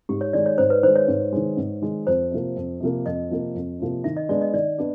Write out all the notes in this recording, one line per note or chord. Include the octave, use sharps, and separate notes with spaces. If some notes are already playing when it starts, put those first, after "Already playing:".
G#2 G4
C#5
D#3 G#3 D5
C#5
G#2 C5
B4
D#3 G#3 C5
C#5
G#2
D#3 G#3
G#2
D#3 G#3
F2 C5
C3 F3 A#3
F2
C3 F3 A#3
F2 D#5
C3 F3 A#3
F2
C3 F3 A#3
D#3 E5
D#5
G#3 B3 D4 D5
D#5
D#3 D5
B3 D4